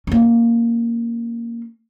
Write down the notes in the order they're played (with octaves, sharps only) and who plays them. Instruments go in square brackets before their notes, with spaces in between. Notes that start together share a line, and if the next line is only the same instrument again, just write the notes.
[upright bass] A#3 C#4